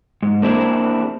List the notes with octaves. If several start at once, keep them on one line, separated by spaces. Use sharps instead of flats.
G#2
A#3 C4 D4 E4 G#4